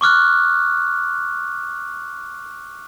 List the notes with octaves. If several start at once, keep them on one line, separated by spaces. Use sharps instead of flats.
C#6 D6 F6 F#6